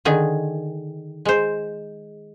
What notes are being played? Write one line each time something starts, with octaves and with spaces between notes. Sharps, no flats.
D3 D#3 G#4
G#3 C5